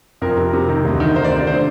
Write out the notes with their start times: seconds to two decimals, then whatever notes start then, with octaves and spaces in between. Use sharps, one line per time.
0.22 F2 A#4
0.37 C3
0.53 C3
0.69 D#3
0.85 D2
1.00 D#3
1.15 D#3 C5
1.24 D5
1.32 C3 C5
1.39 D5
1.47 D3 C5